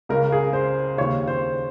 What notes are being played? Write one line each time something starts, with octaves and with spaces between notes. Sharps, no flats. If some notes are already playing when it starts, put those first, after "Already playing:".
C#2 C#3 A#4
G#4
C5
D#2 C#3 C#5
C5